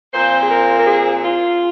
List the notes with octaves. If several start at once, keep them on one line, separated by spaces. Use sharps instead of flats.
A#2 F3 C4 C5
G#4
A#4
A#4
G#4
F4